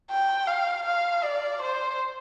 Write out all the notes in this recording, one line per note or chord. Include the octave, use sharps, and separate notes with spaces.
G5
F5
F5
D5
C5